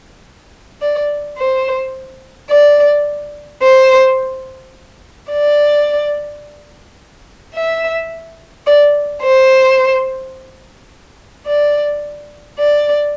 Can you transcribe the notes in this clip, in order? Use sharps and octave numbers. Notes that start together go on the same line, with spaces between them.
D5
C5
D5
C5
D5
E5
D5
C5
D5
D5